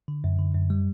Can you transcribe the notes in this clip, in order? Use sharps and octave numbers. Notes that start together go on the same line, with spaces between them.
D3
F#2
D3
F#2
G3